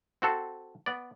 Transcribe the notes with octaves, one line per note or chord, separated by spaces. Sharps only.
C4 F#4 A4 C5
B3 D5